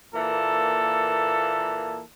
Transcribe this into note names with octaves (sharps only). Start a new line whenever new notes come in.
A#2 E3 A#3 A4